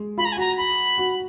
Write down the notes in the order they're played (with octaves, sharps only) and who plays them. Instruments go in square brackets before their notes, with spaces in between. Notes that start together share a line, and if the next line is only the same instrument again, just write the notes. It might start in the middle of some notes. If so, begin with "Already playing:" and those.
Already playing: [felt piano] G#3
[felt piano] F4 [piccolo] B5
[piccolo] A#5
G#5
[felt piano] F#4 [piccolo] A#5
[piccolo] B5
[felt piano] F#4